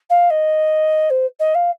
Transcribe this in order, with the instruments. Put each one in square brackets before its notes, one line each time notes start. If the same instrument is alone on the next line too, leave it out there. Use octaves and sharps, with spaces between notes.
[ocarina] F5
D#5
C5
D#5
F5